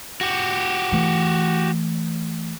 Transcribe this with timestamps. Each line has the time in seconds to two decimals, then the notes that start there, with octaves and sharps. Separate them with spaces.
0.21 F#4 G4
0.92 E3 A3